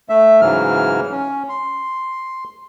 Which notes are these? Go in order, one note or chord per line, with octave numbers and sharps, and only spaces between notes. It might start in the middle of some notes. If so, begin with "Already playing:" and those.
A3 E5
G#2 C#3 E3 F#3 F6
C#4
C6